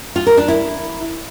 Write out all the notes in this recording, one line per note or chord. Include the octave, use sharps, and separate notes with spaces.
F4
A#4
D4
E4